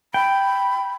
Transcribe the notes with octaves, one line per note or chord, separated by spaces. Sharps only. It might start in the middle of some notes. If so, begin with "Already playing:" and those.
G5 B5